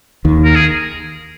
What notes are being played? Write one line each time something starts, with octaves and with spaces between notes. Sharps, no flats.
D#2 D#3
A#4
G#4